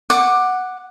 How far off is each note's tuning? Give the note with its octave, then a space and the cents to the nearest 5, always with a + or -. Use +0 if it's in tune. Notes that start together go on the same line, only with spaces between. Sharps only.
F#5 +0 D6 +15